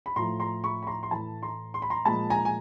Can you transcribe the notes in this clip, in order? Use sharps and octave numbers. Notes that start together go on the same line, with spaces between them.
B5
A2 F3 A3 A#5 C6
A#5 C6
B5 C#6
B5
A#5 C6
C6
A2 E3 A3 A5 B5
A#5 C6
C6
B5
A#5 C6
A#2 F3 G#3 A5 B5
G#5 A#5
G#5